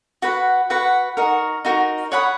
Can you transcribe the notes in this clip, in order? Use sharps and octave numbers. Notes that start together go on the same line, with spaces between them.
F#4 B4 F#5
F#4 B4 F#5
D#4 F#4 A#4
D#4 F#4 A#4
C#5 F#5 B5 D#6